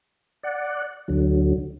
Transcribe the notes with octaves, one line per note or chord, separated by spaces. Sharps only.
D5 F#5
D2 D3 F#3